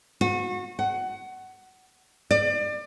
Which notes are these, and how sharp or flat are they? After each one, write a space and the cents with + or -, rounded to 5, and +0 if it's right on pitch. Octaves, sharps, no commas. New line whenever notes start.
F#4 -30
F#5 +20
D5 +30